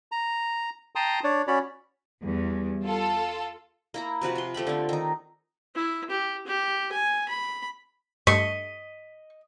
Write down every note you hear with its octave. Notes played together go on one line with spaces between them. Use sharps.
A#5
G5 A5 A#5 C6 D#6
D4 C#5 D5
C#4 F#4 C#5 D5 B5
E2 G3
F4 A4
A#3 E4 A#5
C3 F3 F#4 B4
F4 C6
F3 A3 G4 B5
D3 C4
D#3 D#4
E4
G4
G4
G#5
B5
G2 A3 D#5 C#6 B6 C7